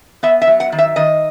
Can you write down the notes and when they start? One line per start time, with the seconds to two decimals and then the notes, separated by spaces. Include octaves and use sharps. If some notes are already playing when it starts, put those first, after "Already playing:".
0.23 B3 E5
0.42 E5
0.47 F#3
0.60 F#5
0.72 D#3
0.78 E5
0.96 D#3 D#5